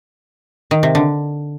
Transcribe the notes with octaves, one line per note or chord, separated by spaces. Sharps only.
D#3
C3
D3